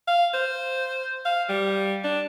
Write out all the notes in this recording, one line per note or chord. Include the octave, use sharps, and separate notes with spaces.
F5
C5
F5
G3
D4